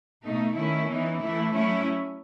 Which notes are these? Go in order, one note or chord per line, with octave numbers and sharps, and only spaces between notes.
B2 A3 D#4
D#3 A3 C#4 E4
E3 B3 D#4
E3 A3 E4
F#3 A3 C#4 E4